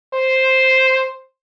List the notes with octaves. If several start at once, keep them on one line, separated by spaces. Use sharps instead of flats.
C5